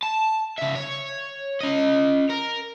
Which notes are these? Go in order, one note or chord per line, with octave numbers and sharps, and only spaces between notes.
A5
C#2 E5
C#5
C#4 D#5
A#4